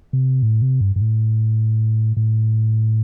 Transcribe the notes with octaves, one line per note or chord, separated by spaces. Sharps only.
C3
A2
C3
G2
G2
A2
A2